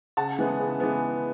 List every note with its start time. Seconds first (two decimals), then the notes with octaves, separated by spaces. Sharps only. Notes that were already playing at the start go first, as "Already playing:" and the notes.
0.17 C#3 F#5 A5
0.39 E3 G#3 B3
0.60 C#3
0.80 E3 G#3 B3